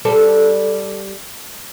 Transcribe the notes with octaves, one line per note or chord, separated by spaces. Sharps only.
G3 A4 C5